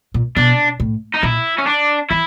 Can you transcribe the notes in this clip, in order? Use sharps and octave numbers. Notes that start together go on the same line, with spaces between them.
A#2
B2 D4
A2
D#4
A#2 E4
C#4
D4
E3 E4